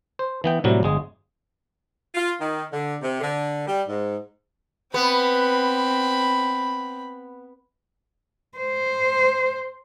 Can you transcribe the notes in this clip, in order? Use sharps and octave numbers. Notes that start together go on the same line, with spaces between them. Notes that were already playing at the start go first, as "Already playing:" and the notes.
C5
E3 B3 G5
A2 C3 F#3 G3
G1 G#3 G#4
F4
D#3
D3
C3
D3
G3
G#2
B3 C4 B5
C5